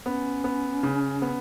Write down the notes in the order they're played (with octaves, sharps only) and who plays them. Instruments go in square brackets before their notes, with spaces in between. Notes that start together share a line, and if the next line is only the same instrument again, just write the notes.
[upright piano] B3 [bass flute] C#4
[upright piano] B3
C#3
B3